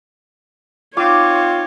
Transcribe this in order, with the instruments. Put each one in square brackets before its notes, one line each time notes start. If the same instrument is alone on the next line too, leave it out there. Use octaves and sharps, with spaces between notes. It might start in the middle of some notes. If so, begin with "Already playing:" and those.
[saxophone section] C4 F4 [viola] D#4 C#5 [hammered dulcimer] D6